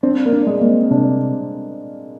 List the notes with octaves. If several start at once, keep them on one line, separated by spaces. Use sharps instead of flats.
C4 D4
A#3
D4
G#3
A#3
C4
C3 D4